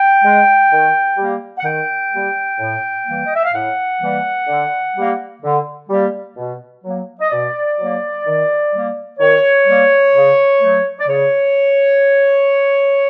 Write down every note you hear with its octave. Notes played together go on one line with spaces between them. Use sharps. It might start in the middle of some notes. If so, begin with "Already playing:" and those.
Already playing: G5
G#3
D#3
G3 A#3
F#5
D#3 G5
G3 A#3
A2
E3 G3 A#3
D#5
E5
F5
A2 F#5
E3 G3 A#3
D3
G3 A#3
D3
G3 A#3
B2
F#3 A#3
D#5
B2 D5
F#3 A#3
D#3
G3 A#3
D#3 C#5
G3 A#3
C#3
F#3 A3
D5
C#3 C#5